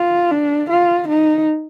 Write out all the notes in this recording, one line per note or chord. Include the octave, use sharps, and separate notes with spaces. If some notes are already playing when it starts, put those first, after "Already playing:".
Already playing: F4
D4
F4
D#4